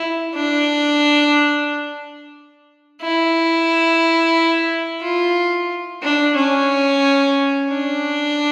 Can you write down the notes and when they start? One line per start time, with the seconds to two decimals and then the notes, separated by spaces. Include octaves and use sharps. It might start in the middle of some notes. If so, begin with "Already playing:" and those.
Already playing: E4
0.35 D4
3.01 E4
5.02 F4
6.02 D4
6.36 C#4
7.70 D4